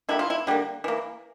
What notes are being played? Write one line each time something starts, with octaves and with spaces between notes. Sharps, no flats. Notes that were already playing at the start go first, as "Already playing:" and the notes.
D3 G3 A#3 E4
F4
E4
D3 G3 A#3
E3 A#3